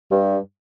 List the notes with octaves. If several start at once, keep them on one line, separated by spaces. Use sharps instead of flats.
G2